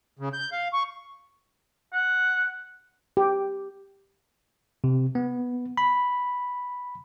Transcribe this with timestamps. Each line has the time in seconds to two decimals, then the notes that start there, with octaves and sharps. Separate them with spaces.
0.19 C#3
0.33 G6
0.52 F5
0.73 C#6
1.93 F#5
3.17 G4
4.84 C3
5.15 B3
5.77 B5